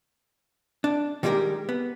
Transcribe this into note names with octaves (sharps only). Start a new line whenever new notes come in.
D4
D#3 G3 G#3 F4 G4 A#4
B3